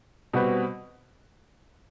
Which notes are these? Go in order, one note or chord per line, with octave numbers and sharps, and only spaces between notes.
B2 G3 C4 F#4 B4